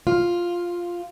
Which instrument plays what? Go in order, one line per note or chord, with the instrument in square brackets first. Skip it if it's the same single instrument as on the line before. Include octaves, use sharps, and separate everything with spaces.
[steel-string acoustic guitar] F4